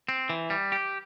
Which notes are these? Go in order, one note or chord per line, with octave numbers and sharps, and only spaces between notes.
C4
E3
G3
G4